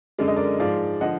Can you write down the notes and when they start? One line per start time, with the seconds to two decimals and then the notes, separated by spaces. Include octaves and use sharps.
0.18 F#2 D3 G#3 D5
0.28 D#5
0.36 A#4 D5
0.60 G#2 F3 G#3 D5 F5
1.01 D3 F3 D#5 F#5